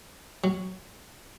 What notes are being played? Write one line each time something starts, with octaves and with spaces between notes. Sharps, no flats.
F#3